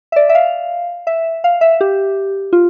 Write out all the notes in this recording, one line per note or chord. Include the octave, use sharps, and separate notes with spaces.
E5
D5
E5
F5
E5
F5
E5
G4
F4